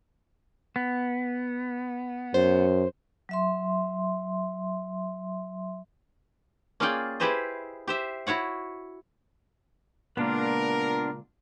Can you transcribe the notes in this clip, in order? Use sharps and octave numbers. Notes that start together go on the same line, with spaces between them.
B3
F#2 C5
F#3 E5 C6
A#3 C#4 F4 G#4 D5 G5
E4 G4 G#4 B4 C5 D#5
G4 C5 E5
E4 F#4 C#5 F#5
C#2 A#2 B3 D4 F4 A#4